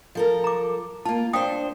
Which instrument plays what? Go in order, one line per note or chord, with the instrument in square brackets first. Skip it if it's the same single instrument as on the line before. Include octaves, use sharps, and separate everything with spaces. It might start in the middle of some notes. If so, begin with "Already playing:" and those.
[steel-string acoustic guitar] F3 A4 A#4
[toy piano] A#5 D6
[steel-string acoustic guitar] A#3 F4 [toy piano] A5
[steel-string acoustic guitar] D4 C5 [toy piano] F5 G5 D#6